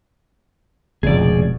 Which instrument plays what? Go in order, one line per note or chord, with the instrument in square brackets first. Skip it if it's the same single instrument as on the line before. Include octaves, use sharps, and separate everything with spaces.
[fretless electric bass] F1 C#2 [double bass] B2 [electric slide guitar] G#4 D5